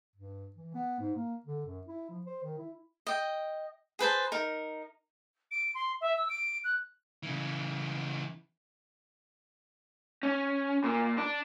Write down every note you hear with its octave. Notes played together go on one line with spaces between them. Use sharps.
G2
E3
B3
G#2
A#3
D3
F#2
E4
F3
C5
D#3
E4
D#5 G5
G#4 B4 C5 A5
D#4 A#4
D7
C6
E5
E6
D7
F#6
C#3 E3
C#4
A#2
D4